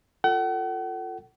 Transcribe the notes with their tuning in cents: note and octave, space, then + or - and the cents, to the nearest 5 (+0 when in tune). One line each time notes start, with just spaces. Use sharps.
F4 +0 A4 +15 F#5 +40